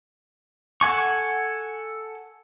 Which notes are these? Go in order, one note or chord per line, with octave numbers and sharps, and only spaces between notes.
A4 F#5 G#5 C#6